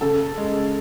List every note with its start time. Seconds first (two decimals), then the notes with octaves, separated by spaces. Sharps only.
0.01 C#3 A4
0.37 G#3